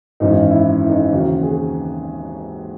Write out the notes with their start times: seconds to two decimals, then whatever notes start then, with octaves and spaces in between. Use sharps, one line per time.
0.20 G#1 F#2 E3 D#4
0.50 E4
0.81 E4
0.89 D#4
0.96 E4
1.11 D#2 C#3 E3 F#4
1.43 G#4